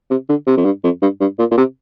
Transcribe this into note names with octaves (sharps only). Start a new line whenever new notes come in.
C3
D3
C3
F2
G2
F2
G2
G2
A#2
A#2
C3